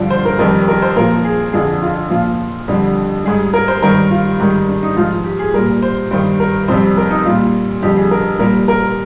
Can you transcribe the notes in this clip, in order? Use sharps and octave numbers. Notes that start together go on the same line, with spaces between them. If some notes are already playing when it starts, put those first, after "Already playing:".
Already playing: G2 D3 F3
C5
A#4
F2 D#3 G3 A#4
A#4
C5
A#2 F3 A#4
G#4
F2 D3 F3 G#4
F4
A#2 F3 F4
F2 D3 G3
G#2 G3 G#4
A#4
C5
G2 D#3 G3 A#4
F4
G#2 D#3 G3
D4
D#4
G#2 F3 F4
G4
G#4
A#2 G3 A#4
C5
G2 D#3 G3 C5
A#4
F2 C3 G3 C5
A#4
D#4
A#2 G3 F4
F2 D3 G3 G4
G#4
A#4
A#2 G3 A#4
A#4